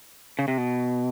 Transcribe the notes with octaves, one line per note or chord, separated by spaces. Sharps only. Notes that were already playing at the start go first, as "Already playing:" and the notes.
C#3
C3
B2